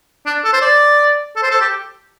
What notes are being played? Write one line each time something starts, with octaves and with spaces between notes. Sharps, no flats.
D4
A4
C5
D5
A4
C5
A4
G4